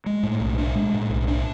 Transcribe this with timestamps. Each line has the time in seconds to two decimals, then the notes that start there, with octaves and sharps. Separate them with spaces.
0.06 G#3
0.23 A2
0.40 B1
0.58 D4
0.75 G#3
0.94 A2
1.10 B1
1.28 D4